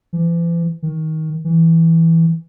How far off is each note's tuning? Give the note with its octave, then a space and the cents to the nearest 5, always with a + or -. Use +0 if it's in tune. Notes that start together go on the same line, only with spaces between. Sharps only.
E3 +40
D#3 +20
E3 -5